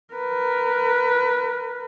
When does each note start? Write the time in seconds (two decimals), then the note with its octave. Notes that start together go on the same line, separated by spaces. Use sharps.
0.14 A#4 B4